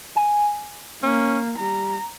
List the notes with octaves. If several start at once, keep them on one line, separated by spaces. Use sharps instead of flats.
G#5
A#3 C#4
G3 A#5